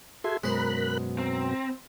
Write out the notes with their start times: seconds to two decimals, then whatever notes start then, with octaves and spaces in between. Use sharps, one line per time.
0.24 F#4 G#4 A4 E5 G#5 C6
0.44 F#2 B2 G#3 A#4 C5 B5 F#6
1.19 C4 A#5